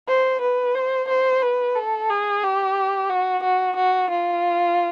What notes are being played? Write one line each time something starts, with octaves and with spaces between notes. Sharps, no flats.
C5
B4
C5
C5
B4
A4
G#4
G4
F#4
F#4
F#4
F4